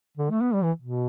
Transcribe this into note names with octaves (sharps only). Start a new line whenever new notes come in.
D3
A3
B3
G3
E3
B2